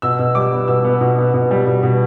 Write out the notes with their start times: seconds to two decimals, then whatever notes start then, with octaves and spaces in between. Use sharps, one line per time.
0.02 B2 E6
0.19 B2
0.35 G3 D6
0.52 B3
0.68 B2 E6
0.84 B3
1.01 B2
1.18 B3
1.34 B2
1.51 G3
1.67 B2
1.83 B2